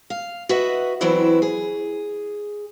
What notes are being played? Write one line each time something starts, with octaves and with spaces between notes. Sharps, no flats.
F5
F#4 B4 D#5 E5 F#5
E3 F#3 B3 C4 D4 E4
G#4